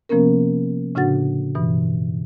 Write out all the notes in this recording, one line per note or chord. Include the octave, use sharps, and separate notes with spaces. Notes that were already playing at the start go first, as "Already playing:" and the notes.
C3 F3 A#3 B3 C#4 A#4
A2 C#3 D4 F#4 F#5 A6
G2 B2 E3